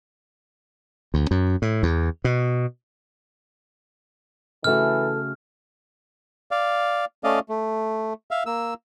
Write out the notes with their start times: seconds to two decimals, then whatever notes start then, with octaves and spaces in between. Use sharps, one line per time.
1.14 D2
1.31 F#2
1.62 A2
1.83 E2
2.24 B2
4.64 C#3 E3 A3 F#4 A4 F6
6.51 D5 F5
7.24 A3 C#4 D5 D#5 F5
7.49 A3
8.31 E5 F5
8.46 A#3 E6